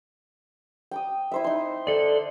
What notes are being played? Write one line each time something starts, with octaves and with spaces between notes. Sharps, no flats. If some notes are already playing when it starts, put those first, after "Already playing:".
G5 D6 D#6
E4 C5 E5
D#4 C6
A4 D5 D#5